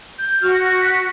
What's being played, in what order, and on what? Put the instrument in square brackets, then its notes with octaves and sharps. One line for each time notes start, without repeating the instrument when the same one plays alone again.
[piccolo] G6
[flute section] F#4 [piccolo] F6
[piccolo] A#6
B6